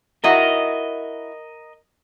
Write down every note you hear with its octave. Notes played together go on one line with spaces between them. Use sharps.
E4 F#4 A#4 D#5 A#5